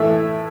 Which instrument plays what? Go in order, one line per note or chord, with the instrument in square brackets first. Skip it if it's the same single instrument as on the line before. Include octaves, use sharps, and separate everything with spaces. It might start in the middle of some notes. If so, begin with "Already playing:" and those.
Already playing: [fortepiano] A2 E3 A3 E5